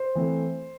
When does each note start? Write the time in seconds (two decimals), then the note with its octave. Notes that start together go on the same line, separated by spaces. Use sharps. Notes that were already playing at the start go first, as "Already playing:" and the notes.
Already playing: C5
0.15 E3 A3 C4